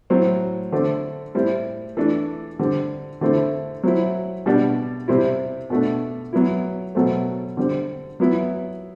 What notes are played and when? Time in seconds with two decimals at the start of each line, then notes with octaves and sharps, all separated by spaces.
0.10 A2 F#3 C4
0.72 D3 A3 C4
1.35 A2 G3 C4 E4
1.97 E3 A3 D4
2.59 D3 G3 C4
3.21 D3 A3 C4 E4
3.83 F#3 C4 E4
4.46 B2 G3 D4
5.08 C3 G3 C4 E4
5.70 B2 A3 D4
6.33 F#3 B3 E4
6.95 B2 F#3 A3 C4
7.57 D3 G3 C4
8.20 F#3 B3 E4